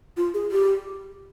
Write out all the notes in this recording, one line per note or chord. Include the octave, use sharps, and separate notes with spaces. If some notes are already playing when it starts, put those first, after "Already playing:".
F4
G#4
G4